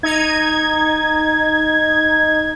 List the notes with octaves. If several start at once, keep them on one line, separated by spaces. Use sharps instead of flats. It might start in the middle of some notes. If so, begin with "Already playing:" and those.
D#4 G#6